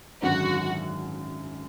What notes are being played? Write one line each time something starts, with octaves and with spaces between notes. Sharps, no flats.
G#1 F#2 D3 F#4